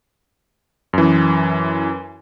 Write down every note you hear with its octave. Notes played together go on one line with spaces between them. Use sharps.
F#2 E3